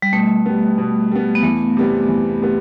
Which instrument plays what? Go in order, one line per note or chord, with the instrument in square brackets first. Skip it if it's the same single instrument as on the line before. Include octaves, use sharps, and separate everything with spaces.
[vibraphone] G3
[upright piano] B2 [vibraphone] A3
[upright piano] G3 B3
B2
G3 B3
[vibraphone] B3
[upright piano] E2 [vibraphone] A3
[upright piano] C3 G3 B3
E2
C3 G3 B3